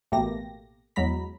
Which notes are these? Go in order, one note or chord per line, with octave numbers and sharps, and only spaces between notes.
A1 B2 A3 A#3 G4 A#6
E2 F#3 G#3 A#5 B5 B6